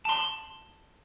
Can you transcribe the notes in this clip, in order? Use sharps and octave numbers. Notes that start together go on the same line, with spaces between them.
A5 C6